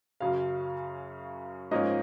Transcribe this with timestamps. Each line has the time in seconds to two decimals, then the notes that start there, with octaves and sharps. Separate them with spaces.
0.20 F#2 C#3 F#3 F5
1.71 G#2 F3 A#3 C#4 D#5